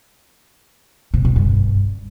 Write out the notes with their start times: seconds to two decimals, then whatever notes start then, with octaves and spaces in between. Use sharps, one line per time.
1.14 C3
1.25 C3
1.36 G2